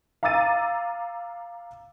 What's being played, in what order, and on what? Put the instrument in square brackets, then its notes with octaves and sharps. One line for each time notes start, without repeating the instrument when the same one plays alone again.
[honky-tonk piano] F5 A#5 D6 E6 A6 D#7